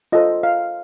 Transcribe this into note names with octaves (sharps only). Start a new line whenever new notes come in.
F4 A4 C5 D#5
F5